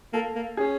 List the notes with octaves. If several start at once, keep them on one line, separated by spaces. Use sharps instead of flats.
A#3 A4
A#3
C#4 G#4